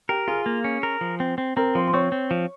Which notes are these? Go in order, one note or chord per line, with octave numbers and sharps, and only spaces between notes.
G4 A#4 G5
F4 G#4 G#5
A#3
C#4
A#4
F3
C4
C4
C4 A#4 A#5
F3 C5 C6
C6
C4 C#5 C#6
C4
F3